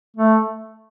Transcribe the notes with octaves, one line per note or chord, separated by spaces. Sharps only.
A3